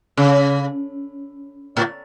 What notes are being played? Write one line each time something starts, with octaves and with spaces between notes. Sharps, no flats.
C#3
A2